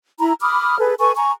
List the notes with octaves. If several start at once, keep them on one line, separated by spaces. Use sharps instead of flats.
E4 A#5 B5
B5 D6 D#6 F6
G#4 A4 B4
A4 B4 G#5 C#6
G#5 A#5 C#6